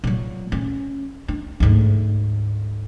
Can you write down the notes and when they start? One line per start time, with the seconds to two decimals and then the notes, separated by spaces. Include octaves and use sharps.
0.04 A#2 F#3
0.52 C#4
1.28 D4
1.60 D2 G#2